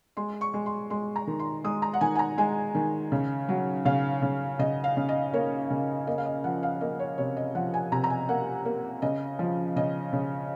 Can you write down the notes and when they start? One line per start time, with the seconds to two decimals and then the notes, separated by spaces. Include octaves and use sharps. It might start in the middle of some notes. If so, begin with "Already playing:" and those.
0.17 G#3 C6
0.41 C#6
0.54 G#3
0.66 C6
0.90 G#3 C6
1.16 A#5
1.27 D#3
1.39 C6
1.64 G#3 D#6
1.82 A#5
1.93 F#5
2.01 D#3 G#5
2.15 G#5
2.19 A#5
2.38 G#3 G#5
2.75 D#3
3.12 C#3
3.49 F#3
3.85 C#3 F5
4.22 C#3
4.59 C#3 D#5
4.84 F5
4.97 C#3
5.09 D#5
5.33 A#3 C#5
5.70 C#3
6.07 A#3 D#5
6.18 F5
6.25 D#5
6.44 F3 F#5
6.63 F5
6.81 A#3 D#5
6.99 C#5
7.18 C3 C#5
7.37 D#5
7.55 F3 F#5
7.74 G#5
7.92 C3 A#5
8.04 A#5
8.10 G#5
8.29 A#3 F#5
8.65 A#3
9.02 C#3 D#5
9.39 F3
9.76 C#3 D#5
10.13 C#3